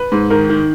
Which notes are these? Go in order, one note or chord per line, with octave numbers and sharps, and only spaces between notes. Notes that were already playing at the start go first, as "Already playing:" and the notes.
Already playing: B4
G#2
D#3 A#4
D#3